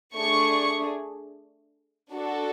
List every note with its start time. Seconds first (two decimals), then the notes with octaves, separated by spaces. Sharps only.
0.15 A3 D4 G#4 C#6
2.13 D4 F#4 A4